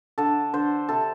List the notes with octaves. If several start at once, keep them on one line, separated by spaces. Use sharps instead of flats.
D3 A4
D3 C5
C3 A4